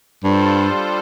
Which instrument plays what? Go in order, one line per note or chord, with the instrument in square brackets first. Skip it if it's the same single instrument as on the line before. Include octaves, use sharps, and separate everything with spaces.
[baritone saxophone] G2 [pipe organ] G3 D4 F4 A4 C5